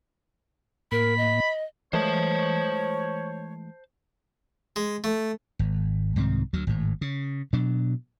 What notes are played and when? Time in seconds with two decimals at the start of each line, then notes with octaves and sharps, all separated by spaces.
0.92 A2 A#3 A#4 B5
1.18 D#5
1.93 E3 G#3 A3 C5 C#5 A5
4.76 G#3
5.04 A3
5.59 G#1
6.16 C2 G#2 D#3 C4
6.53 D2 F#3
6.67 G#1 A2
7.01 C#3
7.53 B2 F#3 D4